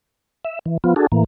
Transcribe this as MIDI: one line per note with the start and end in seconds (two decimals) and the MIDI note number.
0.45 0.59 76
0.66 0.77 52
0.84 0.94 53
0.84 0.94 59
0.84 0.94 65
0.96 1.07 62
0.96 1.07 66
0.96 1.07 68
0.96 1.07 69
1.12 1.24 45
1.12 1.24 52
1.12 1.24 58